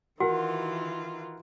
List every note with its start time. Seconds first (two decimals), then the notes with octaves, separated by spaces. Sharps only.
0.20 D#3 E3 F4 F#4 A#4 F#5